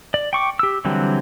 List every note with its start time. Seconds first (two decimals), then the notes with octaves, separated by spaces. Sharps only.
0.14 D5
0.33 G5 C#6 D6
0.59 G4 E6
0.85 D3 E3 F#3 G3 C4